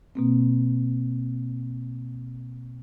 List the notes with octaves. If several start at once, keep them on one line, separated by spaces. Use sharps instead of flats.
B2 A#3 C4